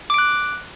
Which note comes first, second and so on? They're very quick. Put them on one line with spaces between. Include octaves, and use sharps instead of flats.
D6 D7 F#6